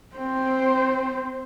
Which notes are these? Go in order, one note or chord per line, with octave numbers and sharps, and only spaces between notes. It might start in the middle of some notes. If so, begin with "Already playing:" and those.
C4 C5